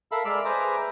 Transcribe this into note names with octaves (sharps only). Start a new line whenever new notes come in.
A4 A#4 E5 F5 B5
G#3 D5 E5 D6 E6 F6
G#4 B4 C5 E5 A#5 D6